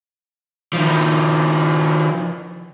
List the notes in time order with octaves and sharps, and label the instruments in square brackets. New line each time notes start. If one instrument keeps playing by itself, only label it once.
[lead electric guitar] D#3 F3